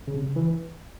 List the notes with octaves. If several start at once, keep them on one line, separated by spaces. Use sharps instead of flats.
C#3
C3
C#3
E3